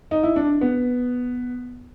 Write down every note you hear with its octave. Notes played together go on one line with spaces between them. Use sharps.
D#4
E4
D4
B3